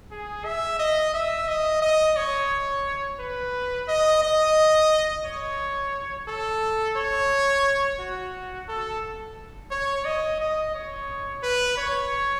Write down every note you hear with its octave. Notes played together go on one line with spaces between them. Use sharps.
G#4
E5
D#5
E5
D#5
D#5
C#5
B4
D#5
D#5
C#5
A4
C#5
F#4
A4
C#5
D#5
D#5
C#5
B4
C#5